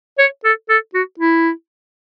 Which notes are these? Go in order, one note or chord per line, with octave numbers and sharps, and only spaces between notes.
C#5
A4
A4
F#4
E4